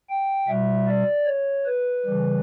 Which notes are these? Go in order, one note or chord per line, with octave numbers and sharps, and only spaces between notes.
G5
B2 G3 E5
D5
C#5
B4
C#3 E3 G3